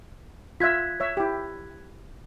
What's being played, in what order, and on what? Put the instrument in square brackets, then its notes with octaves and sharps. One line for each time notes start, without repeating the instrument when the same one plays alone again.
[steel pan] F4 E5 [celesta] F#6 G#6 B6
[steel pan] C#5 E5
E4 G4